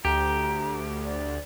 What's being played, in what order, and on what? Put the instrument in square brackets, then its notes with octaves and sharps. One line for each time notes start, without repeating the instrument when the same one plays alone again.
[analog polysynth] D2 [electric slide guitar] G4 [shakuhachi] A#5
[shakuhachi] D5